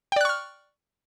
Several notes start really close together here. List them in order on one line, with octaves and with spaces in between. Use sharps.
G5 D5 F#6 C#6 F6